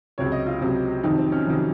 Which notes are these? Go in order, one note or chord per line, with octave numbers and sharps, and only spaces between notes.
C#2 C3 F#3 C#5
D#5
F4
C#2 C3 F#3
F2 C3 D#3 F#3 D#4
C4
C#4
F2 C3 D#3 F#3